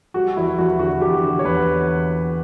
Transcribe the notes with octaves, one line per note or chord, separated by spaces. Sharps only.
G3 F#4
E2 E4
E2 F#4
D3 F#4
E2 G4
D3
C#5
E2 B4